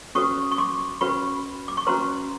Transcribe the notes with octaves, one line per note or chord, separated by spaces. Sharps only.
C#4 F#4 B4 C#6 D#6
C#6
C6 D6
C#4 F#4 B4 B5 C#6
D6
C#6
C#4 F#4 B4 A#5 C6